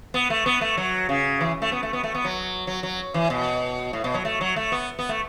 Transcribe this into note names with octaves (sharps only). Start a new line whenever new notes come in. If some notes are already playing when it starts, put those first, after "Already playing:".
B3
A3
B3
A3
F#3
C#3
E3
A3
B3
A3
B3
A3
B3
F#3
F#3
F#3
E3
B2
A2
B2
F#3
A3
F#3
A3
B3
B3
A3